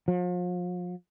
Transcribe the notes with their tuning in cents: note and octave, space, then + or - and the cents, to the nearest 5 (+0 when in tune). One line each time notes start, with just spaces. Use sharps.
F3 +40